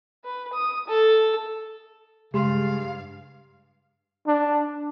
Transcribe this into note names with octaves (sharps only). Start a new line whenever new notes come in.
B4
D#6
A4
G2 C#3 G#3 G4 F5 C6
D4